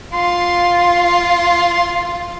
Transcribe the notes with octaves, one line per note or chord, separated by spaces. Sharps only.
F4 C6